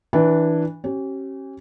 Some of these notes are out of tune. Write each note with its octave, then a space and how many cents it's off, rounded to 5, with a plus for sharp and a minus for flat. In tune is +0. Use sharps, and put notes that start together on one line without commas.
E3 -15 D4 +0
C#4 -35 G4 -40